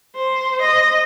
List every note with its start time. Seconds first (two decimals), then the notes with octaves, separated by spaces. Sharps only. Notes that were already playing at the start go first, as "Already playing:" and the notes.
0.16 C5
0.62 D#5